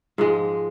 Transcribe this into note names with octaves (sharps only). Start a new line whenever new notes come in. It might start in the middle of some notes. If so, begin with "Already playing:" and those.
G#2 F3 G#3